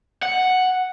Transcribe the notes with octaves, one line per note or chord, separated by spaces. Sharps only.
F#5